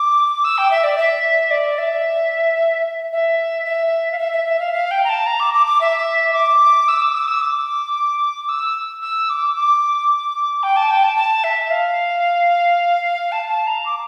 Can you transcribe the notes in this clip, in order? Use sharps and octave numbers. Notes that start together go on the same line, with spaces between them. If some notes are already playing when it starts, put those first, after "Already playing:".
Already playing: D6
E6
G5
E5
D5
E5
D5
E5
E5
E5
F5
E5
E5
E5
F5
F5
G5
A#5
A5
A#5
D6
D6
D6
E5
D6
E6
D6
E6
D6
E6
D6
E6
E6
D6
D6
G5
A5
G5
A5
A5
E5
F5
A5
A5
A#5
D6